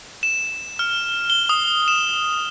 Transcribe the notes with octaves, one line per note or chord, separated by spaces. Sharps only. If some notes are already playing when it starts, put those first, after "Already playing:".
E7
F6
G7
D#6
E7